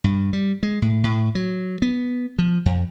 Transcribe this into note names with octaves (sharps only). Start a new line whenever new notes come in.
G2
G3
G#3
A2
A2
F#3
B3
F3
F2